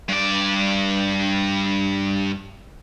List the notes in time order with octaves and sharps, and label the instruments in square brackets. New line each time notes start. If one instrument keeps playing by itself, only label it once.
[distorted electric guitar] G2 D5